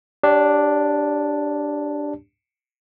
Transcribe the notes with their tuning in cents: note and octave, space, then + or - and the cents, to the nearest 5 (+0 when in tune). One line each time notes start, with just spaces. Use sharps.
D4 +0 G4 +0 C#5 +30